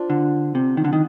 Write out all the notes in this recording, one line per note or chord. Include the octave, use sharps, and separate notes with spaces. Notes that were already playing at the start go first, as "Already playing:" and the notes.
Already playing: D4 F4 C5
D3
C3
D#3
D3
D#3